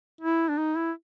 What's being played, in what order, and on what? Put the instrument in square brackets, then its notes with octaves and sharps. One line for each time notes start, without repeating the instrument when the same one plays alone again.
[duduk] E4
D4
D#4
E4